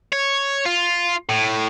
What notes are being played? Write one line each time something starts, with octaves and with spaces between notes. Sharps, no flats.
C#5
F4
A2